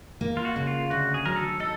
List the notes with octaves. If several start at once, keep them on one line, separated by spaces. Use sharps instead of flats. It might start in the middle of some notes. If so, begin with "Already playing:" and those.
A#3
F4
F#4
C#3
F4
D2 F#4
G#4
F#3 A#4
A4
D#4 A4